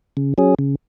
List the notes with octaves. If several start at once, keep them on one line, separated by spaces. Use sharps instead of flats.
C#3
F#3 C#4 G#4
C#3